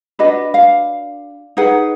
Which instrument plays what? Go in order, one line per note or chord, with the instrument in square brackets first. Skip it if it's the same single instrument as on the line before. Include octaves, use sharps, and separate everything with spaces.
[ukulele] D4 F#4 B4 D#5
F5
D#4 G#4 B4 F#5